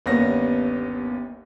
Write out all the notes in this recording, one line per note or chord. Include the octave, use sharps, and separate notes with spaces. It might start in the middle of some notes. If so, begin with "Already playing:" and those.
G1 D#2 A#3 B3 C#4 A#6